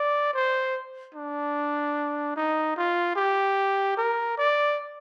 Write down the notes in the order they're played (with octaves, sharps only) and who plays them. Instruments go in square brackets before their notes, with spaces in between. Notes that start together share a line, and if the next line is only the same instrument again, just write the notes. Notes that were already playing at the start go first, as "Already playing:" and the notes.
Already playing: [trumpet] D5
C5
D4
D#4
F4
G4
A#4
D5